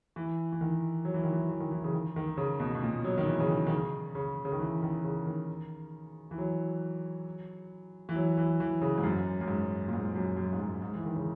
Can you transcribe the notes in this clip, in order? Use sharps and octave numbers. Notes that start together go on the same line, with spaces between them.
E3
E3
D#3
F#3
E3
D#3
E3
E3
D#3
E3
C#3
D#3
D#3
C#3
B2
B2
A#2
F#3
D#3
E3
C#3
D#3
D#3
C#3
C#3
C#3
D#3
E3
D#3
C#3
D#3
E3
F#3
E3
F#3
E3
E3
C#3
G#2
F#2
F#2
G#2
A#2
G#2
F#2
F#2
G#2
F#2
G#2
E3
D#3
C#3